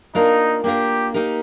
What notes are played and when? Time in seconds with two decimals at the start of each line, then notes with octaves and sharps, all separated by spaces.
0.15 A#3 D4 D#4 F4 A#4
0.64 A#3 D4 F4 G4 A#4
1.14 A#3 D#4 G4 A#4